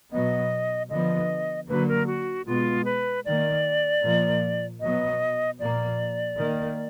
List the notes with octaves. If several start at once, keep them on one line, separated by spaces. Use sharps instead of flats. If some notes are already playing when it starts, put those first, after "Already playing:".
B2 F#3 B3 D#5
D3 F3 B3 D#5
D3 F#3 A#3 B4
A#4
F#4
B2 G#3 B3 F4
B4
D#3 A#3 D5
A#2 F3 A#3
B2 F#3 B3 D#5
A#2 F3 A#3 D5
D#3 A#3